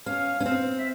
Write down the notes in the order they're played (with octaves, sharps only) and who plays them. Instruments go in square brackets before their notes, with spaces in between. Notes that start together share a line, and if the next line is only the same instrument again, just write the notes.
[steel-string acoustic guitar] C#4 [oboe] F5
[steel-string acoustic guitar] C#4
C4
[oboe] E5